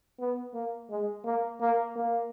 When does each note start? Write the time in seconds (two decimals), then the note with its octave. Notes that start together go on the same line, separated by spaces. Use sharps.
0.20 B3
0.54 A#3
0.90 G#3
1.25 A#3
1.61 A#3
1.96 A#3